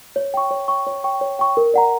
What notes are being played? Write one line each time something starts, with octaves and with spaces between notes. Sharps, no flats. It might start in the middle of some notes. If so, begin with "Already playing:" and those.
C#5
G5 C#6
C#5
G5 C#6
C#5
G5 C#6
C#5
G5 C#6
A#4
D5 F#5 A#5